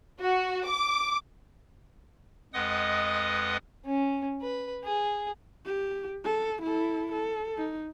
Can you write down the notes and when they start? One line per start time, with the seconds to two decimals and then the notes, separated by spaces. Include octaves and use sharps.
0.21 F#4
0.67 D6
2.54 F2 G#3 B4 D#5 F#5 D#6
3.86 C#4
4.41 B4
4.84 G#4
5.66 G4
6.25 A4
6.63 E4 A4
7.12 A4
7.58 D#4